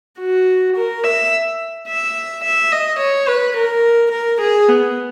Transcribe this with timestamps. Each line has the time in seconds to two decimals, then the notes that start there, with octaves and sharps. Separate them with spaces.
0.19 F#4
0.76 A#4
1.04 E5
1.88 E5
2.44 E5
2.72 D#5
2.99 C#5
3.28 B4
3.57 A#4
4.12 A#4
4.41 G#4
4.69 B3